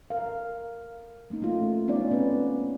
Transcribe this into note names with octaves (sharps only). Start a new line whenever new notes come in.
A#4 F5
A3 A#3 C#4 D#4
A3 F4
B3 C#4 D#4 D5
B3 C4 B4